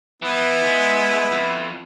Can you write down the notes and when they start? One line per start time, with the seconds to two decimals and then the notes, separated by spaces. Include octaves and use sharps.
0.22 E3 B3 E4
0.64 G#3
1.32 F2